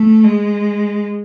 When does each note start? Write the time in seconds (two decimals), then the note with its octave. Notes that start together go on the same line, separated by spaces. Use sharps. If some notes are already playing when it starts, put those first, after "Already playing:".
Already playing: A3
0.24 G#3